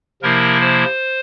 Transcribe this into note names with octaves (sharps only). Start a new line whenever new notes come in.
C3 F3 A#3 E4 A#4
C5